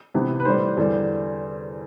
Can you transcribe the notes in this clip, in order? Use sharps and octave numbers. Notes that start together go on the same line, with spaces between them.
C3 E3 B3
B4
A2 E3 G3 C5
E2 D3 G3